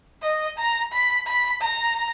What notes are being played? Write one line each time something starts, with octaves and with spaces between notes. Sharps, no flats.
D#5
A#5
B5
B5
A#5